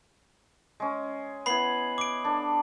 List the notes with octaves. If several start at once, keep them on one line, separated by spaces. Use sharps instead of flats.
G#3 C#4
B3 E4 B5 C7 F#7
D6 D7
D4 A4